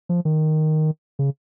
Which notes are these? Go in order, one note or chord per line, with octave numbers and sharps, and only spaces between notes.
F3
D#3
C#3